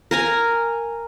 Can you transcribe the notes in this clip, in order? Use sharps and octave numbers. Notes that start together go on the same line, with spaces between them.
A#4 G#5 A#5